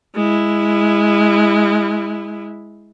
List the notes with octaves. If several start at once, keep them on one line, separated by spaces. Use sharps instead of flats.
G#3 E4